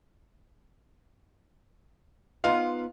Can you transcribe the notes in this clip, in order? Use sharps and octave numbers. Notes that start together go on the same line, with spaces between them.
B3 D#4 F4 F5